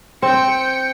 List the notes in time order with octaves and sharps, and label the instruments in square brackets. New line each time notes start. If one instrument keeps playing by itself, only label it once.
[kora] C4 [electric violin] G5 C#7